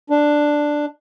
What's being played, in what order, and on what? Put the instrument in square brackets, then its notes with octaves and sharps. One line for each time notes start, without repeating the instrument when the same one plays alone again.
[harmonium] D4